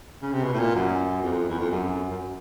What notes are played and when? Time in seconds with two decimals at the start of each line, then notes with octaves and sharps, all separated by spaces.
0.22 C#3
0.33 C3
0.44 B2
0.54 A2
0.60 A#2
0.75 F#2
1.22 F2
1.48 E2
1.59 F2
1.71 F#2
2.09 F#2